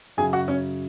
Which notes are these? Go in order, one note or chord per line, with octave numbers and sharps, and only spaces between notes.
F#2 C#3 F#3 G#4 G#5
F#4 F#5
C#4 C#5